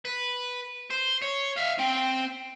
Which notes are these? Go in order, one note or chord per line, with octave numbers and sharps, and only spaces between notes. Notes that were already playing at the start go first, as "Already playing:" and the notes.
B4
C5
C#5
E5 F5
C4 G5